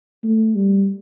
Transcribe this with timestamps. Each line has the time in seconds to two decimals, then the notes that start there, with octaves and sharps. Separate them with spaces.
0.24 A3
0.55 G3